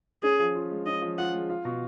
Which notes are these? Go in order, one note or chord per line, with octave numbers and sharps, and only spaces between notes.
C#4 G#4
F3
F4
G#3
C#4 D#5
F3
F4 F#5
G#3
F4
B2